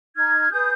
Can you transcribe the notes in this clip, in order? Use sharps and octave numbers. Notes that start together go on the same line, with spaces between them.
D#4 F6 G#6
G#4 B4 D#6 G6